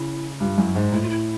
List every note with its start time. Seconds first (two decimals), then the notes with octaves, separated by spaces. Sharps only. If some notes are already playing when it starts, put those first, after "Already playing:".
Already playing: C#3 E4
0.40 G2 F4
0.58 F#2 E4
0.75 G#2 D#4
0.92 A2 E4
1.02 F4
1.10 E4